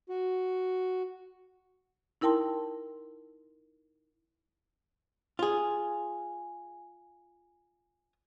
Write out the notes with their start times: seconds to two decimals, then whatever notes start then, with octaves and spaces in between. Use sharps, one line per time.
0.09 F#4
2.21 D#4 E4 A#4 G5 A5 C6
5.39 F4 G#4